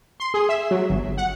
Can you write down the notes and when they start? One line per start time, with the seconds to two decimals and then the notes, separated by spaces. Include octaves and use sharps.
0.20 C6
0.34 G#4
0.49 E5
0.71 F#3
0.90 G1
1.18 F#5